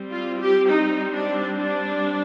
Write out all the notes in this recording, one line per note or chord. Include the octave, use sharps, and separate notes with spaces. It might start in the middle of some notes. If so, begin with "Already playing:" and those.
Already playing: G3 C4
F4
G4
D#4
D4
D4